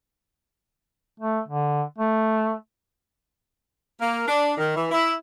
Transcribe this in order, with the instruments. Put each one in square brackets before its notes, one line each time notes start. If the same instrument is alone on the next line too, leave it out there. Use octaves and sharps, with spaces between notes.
[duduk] A3
D3
A3
[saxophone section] A#3
D4
D#3
E3
E4